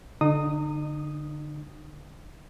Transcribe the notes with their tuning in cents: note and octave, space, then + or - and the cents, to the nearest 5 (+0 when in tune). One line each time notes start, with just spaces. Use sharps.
D3 +0 D#4 -35 D#6 +0